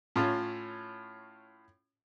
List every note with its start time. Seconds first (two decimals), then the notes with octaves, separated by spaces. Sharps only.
0.16 A2 C#4 F4